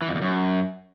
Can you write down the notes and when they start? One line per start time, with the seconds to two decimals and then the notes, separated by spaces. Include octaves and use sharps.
0.02 E3
0.08 F2
0.15 E2
0.22 F#2